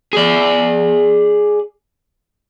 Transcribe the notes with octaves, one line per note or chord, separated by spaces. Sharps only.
G#4 D5